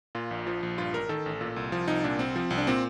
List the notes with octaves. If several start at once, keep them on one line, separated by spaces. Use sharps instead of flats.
A#2 F4
A#1
F3
A#1
G2 F4
A1 A#4
D#3 A4
A1
A#2
C2
F3
C2 D#4
A#2 D4
C2 C4
F3
C2
D4
A#2 C4